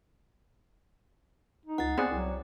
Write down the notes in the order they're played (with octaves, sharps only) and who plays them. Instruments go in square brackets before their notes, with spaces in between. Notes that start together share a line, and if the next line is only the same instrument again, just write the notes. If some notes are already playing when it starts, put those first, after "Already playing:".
[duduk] D#4
[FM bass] C#2 [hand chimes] F#5 A6
[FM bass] B3 [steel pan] C4 G#4 F#5 [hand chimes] D5
[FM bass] C2 [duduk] F#3